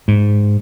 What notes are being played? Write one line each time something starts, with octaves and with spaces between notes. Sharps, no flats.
G#2